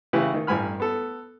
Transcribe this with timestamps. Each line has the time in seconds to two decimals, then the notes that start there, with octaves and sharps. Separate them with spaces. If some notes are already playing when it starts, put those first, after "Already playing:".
0.13 C#3 E3 E4 G4 B4
0.34 D#3
0.47 A1 G2 G#5 B5 F6
0.80 B3 A4